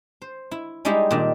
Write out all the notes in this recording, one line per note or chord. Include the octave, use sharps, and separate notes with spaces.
C5
E4
G3 G#3 D#4 E4 G4
A#2 D#3 D4